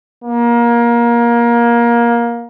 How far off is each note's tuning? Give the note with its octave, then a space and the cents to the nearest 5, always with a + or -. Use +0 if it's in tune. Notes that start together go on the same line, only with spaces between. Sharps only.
A#3 +20